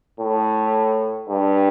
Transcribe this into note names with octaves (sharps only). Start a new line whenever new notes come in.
A2
G2